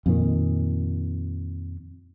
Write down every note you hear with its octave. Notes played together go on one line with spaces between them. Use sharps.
F2 A#2 D#3